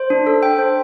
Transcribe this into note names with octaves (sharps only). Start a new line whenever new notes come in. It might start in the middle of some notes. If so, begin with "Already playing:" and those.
Already playing: C5
D4
A4
G5
C5